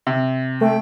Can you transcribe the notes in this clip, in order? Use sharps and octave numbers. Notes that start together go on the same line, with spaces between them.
C3
A3 G5